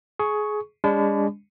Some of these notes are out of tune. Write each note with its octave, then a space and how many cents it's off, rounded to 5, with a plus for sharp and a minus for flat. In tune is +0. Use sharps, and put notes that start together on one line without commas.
G#4 +20 C#6 +0
G#3 -40 D4 -35 B5 +35